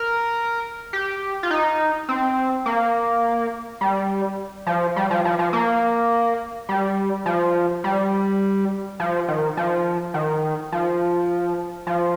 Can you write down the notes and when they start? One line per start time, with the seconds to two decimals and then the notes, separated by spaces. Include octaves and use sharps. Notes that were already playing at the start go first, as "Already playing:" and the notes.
Already playing: A#4
0.93 G4
1.43 F4
1.51 D#4
2.09 C4
2.66 A#3
3.81 G3
4.67 F3
4.96 G3
5.11 F3
5.25 F3
5.39 F3
5.53 A#3
6.69 G3
7.26 F3
7.84 G3
9.00 F3
9.28 D#3
9.57 F3
10.14 D#3
10.72 F3
11.87 F3